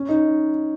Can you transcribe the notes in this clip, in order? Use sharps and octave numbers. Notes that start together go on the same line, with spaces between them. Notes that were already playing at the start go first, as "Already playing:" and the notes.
Already playing: C#4
D#4